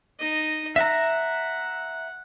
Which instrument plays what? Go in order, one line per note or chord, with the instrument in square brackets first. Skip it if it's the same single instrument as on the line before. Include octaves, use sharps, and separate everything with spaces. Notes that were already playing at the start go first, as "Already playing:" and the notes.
[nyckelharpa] D#4 D#5
[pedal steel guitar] E5 A#5 [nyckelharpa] F#5